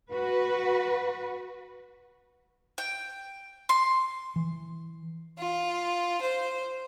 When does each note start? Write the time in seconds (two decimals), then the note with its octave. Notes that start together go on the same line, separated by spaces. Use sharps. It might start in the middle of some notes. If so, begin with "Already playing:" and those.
0.13 F#4 B4
2.78 G5
3.69 C6
4.36 E3
5.38 F4
6.22 C5